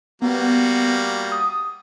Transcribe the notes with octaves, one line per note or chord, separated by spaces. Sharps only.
G3 A#3 B3 F#4
D#6